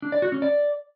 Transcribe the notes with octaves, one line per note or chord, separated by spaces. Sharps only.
D4
D5
F#4
C#4
D5